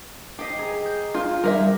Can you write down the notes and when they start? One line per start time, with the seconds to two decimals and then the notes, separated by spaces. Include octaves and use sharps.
0.39 G4 D#5 B6 C7
0.59 G#4 A#5
0.85 G6
1.14 F4
1.44 G3 A#4 B4 E5